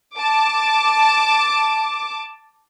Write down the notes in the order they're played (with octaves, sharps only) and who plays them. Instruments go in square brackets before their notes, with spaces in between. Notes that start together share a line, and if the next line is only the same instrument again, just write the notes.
[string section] A5 D6